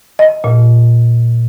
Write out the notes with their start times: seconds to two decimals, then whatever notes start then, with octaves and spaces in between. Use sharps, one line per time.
0.19 D#5
0.44 A#2